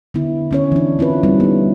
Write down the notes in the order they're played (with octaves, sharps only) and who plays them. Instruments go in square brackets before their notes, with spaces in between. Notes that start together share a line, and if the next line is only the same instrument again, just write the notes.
[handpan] D3 B3 E4
D3 C#4 C#5
E3 D4
C4 E4 F4 B4
G3 C4 D#4
B3 D#4